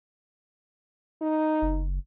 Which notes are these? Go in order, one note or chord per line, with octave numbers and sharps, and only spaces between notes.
D#4
F#1